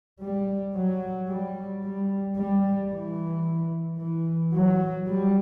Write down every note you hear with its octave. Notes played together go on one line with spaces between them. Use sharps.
G3
F#3
G3
G3
G3
E3
E3
F#3
G3